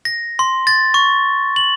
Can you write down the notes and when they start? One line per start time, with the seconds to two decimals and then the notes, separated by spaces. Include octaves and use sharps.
0.05 A#6
0.39 C6
0.67 A6
0.94 C#6
1.56 F#7